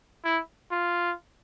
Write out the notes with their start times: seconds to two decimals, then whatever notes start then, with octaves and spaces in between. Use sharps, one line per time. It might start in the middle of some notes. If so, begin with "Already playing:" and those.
0.24 E4
0.71 F4